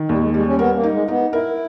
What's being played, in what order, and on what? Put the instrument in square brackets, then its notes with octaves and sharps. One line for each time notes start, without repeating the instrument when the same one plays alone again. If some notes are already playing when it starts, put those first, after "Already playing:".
Already playing: [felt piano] D#3
[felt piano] D#2 [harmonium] G3
[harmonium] G#3
[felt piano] G3 [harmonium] G#3
[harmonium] C#4
[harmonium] B3 [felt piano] A#4
[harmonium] A#3
[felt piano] D#4
[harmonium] G#3
[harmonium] B3 [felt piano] D#4
[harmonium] E4 [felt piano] A#4